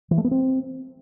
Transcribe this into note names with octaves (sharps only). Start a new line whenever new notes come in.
E3
A3
B3
C4